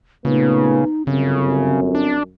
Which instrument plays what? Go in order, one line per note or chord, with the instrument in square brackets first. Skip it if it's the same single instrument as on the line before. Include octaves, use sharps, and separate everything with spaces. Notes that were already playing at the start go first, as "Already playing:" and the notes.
[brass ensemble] A#2 A3 B3 [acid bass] C#3 [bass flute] D#4
[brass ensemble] G1 F#2 [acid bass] C#3 [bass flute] C4
[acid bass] D4